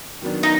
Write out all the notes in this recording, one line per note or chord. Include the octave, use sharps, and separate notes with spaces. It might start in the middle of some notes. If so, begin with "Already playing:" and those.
D#3 F#3 B3 D4
D#4